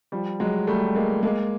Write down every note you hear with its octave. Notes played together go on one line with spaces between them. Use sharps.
F3 G3
F#3 G#3
G3 A3
G#3 A#3
G#3 A#3